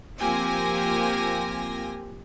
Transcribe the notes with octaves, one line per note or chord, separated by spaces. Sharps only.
F3 A#3 C4 G4 G#5 A#6